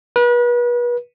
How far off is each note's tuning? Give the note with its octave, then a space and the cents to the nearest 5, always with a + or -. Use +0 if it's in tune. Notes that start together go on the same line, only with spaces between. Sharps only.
B4 -35